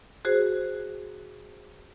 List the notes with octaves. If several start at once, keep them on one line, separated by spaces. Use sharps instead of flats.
F#4 G#4 C5